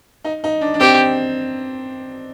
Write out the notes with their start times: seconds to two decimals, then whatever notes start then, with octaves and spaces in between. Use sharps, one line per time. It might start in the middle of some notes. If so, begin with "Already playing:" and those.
0.25 D#4
0.44 D#4
0.61 D4
0.74 D4
0.80 C4 G4